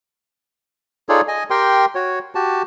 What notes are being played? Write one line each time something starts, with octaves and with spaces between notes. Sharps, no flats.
D#4 F4 G#4 A4 C#5 D5
D#5 G#5
G4 A#4 G5 C6
F#4 C#5
F#4 G4 A5